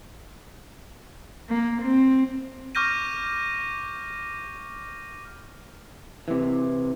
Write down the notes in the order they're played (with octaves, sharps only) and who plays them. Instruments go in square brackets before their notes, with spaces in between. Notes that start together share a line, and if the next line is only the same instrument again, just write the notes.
[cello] A#3
C4
[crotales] C#6 D6 F6 G6 A#6 D#7
[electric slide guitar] C3 E3